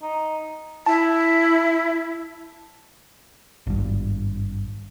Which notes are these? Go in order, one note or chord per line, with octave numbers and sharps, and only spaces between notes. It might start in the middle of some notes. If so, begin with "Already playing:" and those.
D#4
E4 A5
G#1 G2